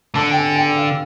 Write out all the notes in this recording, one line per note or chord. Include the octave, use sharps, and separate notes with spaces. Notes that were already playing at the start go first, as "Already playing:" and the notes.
D3 A5
G5
G#5
G5
F5